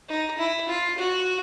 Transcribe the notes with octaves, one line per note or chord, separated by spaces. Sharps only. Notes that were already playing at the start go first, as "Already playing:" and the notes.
D#4
E4
F4
F#4